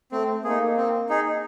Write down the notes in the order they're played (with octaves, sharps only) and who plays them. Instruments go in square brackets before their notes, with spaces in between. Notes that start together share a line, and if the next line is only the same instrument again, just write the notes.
[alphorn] A3 [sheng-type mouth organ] C4
[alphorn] A#3 [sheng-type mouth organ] D#4 G#4
[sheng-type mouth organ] C4
D#4 G#4